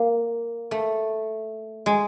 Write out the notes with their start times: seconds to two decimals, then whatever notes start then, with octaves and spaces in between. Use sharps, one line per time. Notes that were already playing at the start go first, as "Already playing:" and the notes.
Already playing: A#3
0.71 A3
1.86 G#3